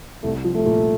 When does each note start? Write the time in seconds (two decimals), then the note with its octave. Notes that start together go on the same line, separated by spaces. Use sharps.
0.23 C2 A3
0.44 F3
0.55 A3
0.66 A#2